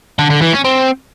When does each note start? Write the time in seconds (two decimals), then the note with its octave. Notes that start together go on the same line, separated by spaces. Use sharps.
0.19 D3
0.30 D3
0.42 E3
0.53 C#4
0.64 C4